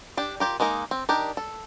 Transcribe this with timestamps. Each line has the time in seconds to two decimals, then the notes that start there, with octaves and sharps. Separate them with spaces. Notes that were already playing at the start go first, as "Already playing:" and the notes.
0.17 D4 G4
0.40 F4 G4 A#4
0.60 G#3 A#3 D#4 A#4
0.91 C4
1.09 D4 D#4 G4 A#4
1.37 A4